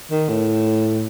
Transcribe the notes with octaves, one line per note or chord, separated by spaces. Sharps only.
D#3
A2